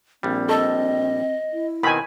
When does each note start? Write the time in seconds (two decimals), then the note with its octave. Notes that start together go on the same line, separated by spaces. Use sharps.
0.23 A#1 G3 C4
0.49 A4 D#5
1.53 E4
1.83 B2 D#3 C4 G#5 B5